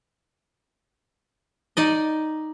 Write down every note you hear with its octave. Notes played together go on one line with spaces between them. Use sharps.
D#4 D5 D#5